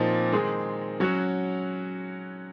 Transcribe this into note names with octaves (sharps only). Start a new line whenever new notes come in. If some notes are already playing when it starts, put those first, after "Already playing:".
Already playing: A#2 F3 C4 D#4
D#3 G#3 C4 D#4 G#4
F#3 C#4 F#4